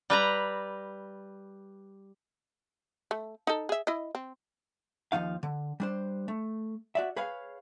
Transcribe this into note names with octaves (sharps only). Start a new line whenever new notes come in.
G3 B4 A#5
A3
D#4 A4
G#4 E5
E4 D#5
C4
D#2 C#3 F3 D#4 F5
D3
G3 D4 C5
A3
F#4 D5 E5
G#4 B4 C#5 F5